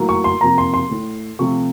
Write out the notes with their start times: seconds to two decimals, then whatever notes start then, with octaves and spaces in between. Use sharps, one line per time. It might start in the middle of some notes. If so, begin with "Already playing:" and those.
Already playing: A2 F#3 A#3
0.09 C#6
0.24 C6
0.41 C3 F3 A#3 A#5
0.58 C6
0.74 C6
0.90 A2 A3
1.39 C3 F3 A3 C#6